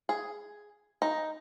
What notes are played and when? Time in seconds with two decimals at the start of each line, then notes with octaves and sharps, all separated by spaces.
0.09 G#4
1.02 D#4